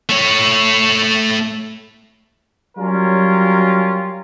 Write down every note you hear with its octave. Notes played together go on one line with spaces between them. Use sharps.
A3 C#5
F#3 G3 C#4 F4 A#4